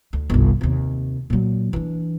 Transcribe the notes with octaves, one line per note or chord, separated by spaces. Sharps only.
D2
G1 C2
D#2 C3
A#2 F#3
E3 D4